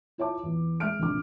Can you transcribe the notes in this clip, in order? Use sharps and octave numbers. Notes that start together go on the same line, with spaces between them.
E4 F4 C#5 E5 A5 D6
E2
G#3 E5 F6 D7
F1 A#1 D6